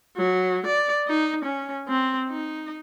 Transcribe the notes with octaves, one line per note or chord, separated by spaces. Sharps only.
F#3
D5
D#4
C#4
C4
D#4